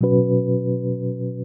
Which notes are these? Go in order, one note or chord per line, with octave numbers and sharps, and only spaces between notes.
B2 F#3 C#4 F#4 B4